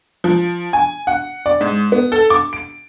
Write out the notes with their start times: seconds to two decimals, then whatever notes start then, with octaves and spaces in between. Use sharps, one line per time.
0.24 F3
0.73 G#5
1.07 F#5
1.46 D5
1.61 G#2
1.92 B3
2.12 A4
2.30 D6
2.53 D7